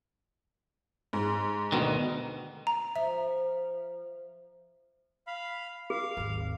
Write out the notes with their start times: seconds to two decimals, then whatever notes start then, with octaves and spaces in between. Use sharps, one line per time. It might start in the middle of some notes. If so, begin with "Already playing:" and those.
1.13 G#2
1.72 D2 B2 D#3
2.67 A#5
2.96 F3 E5
5.27 F5 B5
5.90 G#4 F5
6.17 G#1 D#2